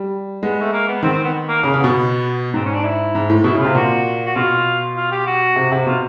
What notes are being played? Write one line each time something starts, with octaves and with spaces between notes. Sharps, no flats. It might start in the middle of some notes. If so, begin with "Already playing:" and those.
Already playing: G3
G#3 B3
A3
A#3
B3
D#3 C4
C4
B3
A#3
C#3 A#3
C#3
B3
B2
G#2 C4
C#4
D4
E4
G#2
A2
B2 E4
C#3
C3 F4
A#2 F#4
F#4
B2 F4
F4
G4
F#4
C3
C3
B2 F4